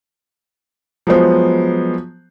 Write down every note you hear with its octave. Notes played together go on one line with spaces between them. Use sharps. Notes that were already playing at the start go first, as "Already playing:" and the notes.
F3 F#3 G#3 B3 C5